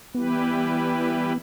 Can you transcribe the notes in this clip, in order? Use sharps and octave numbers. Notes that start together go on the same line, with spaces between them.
E3 G3 B3 E4 G4 B4